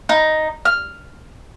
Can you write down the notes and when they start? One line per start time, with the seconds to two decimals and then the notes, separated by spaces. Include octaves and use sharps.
0.09 D#4
0.65 F6